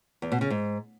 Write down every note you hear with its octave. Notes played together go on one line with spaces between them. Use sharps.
E2
B2
C#3
G#2